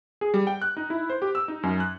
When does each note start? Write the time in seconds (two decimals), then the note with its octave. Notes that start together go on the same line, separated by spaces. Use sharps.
0.21 G#4
0.34 G3
0.47 G5
0.62 F#6
0.77 D#4
0.90 E4
1.10 C5
1.22 G4
1.35 E6
1.48 D#4
1.63 F#2
1.80 F#6